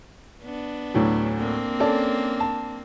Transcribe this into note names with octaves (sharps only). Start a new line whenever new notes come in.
B3 D4
D2 A2 F#3
A#3 C4 D4
C#4 A4 D5
A5